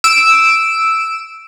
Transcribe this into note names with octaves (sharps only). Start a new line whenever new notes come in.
E6 D7 E7